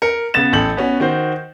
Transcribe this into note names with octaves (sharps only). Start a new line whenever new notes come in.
A#4 C#7
C#3 B3 A6 E7
A1 A4 G6 F#7
B3 C#4 F#4
D#3 F#4 C5